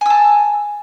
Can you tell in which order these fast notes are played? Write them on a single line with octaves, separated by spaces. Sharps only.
G#5 E6 A5